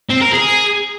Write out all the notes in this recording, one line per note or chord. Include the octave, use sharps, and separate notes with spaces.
C4
A#4
G#4